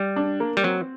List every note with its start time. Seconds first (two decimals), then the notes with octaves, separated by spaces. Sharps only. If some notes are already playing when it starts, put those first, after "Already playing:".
Already playing: G3
0.16 D4
0.40 A#3
0.57 G3
0.64 F#3 C4